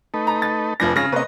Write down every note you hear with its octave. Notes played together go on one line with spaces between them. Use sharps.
A3 D#4 B4
A#5
A6
F1 F3 D4 B4 G#5 A#6
C#3 G#3 C#4 F4 A#6
C3 A#3 C#4 B4 D#5